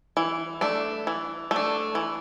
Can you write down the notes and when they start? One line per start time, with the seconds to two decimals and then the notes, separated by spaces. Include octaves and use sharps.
0.17 E3
0.61 A3 D4
1.07 E3
1.51 A3 D4
1.95 E3